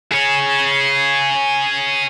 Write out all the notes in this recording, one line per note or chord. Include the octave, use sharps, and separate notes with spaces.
G#4 C#5